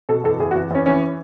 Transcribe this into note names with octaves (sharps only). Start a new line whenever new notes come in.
B2 A4
E2 A4
E2 G#4
F#4
E2
E2 C#4
E3 C#4